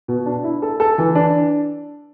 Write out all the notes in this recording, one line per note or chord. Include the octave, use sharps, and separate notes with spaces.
B2
D4
E4
A4
A4
E3
D4